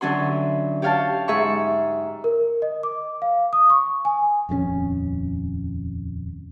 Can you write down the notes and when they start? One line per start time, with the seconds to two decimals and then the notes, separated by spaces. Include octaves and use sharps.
0.01 D3 E3 F#3 C#4 F#4 C6
0.82 G4 C#5 F5 G5 A5
1.28 G#2 G#4 E5 C6 C#6
2.24 A#4
2.62 D#5
2.83 D6
3.22 F5
3.53 D#6
3.70 C#6
4.05 G#5
4.49 D#1 F2 F#3 C#4